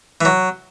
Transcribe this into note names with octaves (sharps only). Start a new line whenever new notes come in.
E3
F#3